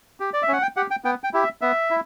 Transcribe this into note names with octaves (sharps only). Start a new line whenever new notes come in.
G4
D5
E5
C#4 F#5
G5
G4 F#5
G5
B3 G5
G5
E4 G4
E5
B3 E5
E4